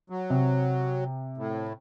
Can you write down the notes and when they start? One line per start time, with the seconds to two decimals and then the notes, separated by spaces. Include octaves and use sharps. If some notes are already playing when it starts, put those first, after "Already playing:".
0.10 F#3
0.30 C3
1.37 A2